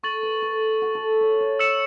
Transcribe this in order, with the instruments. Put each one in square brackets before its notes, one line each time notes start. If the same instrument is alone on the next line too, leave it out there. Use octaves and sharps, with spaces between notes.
[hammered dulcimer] A4 [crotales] C#6 A6 F#7
[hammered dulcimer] B4
A4
F#4
A4
C#5
C#5
[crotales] E6 C#7 E7